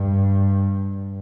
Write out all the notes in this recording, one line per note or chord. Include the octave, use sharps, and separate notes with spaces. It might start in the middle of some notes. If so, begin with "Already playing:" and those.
Already playing: G2